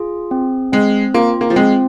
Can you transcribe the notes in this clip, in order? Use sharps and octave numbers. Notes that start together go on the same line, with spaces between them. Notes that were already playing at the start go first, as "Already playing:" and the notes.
Already playing: F4 G#4
C4
G#3 C4
A#3 F4
A#3
F3
G#3 C4